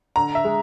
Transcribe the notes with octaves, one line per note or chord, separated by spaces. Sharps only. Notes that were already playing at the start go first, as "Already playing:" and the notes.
D3 A#5
E5
G#3